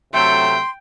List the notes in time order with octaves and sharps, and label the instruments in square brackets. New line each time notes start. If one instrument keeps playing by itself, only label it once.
[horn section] C3 F#3 A3 [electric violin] G5 [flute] C6